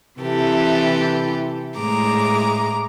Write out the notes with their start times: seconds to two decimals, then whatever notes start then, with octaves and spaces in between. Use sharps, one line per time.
0.19 C3 E3 G4 A4
1.77 A2 G#3 A#5 D6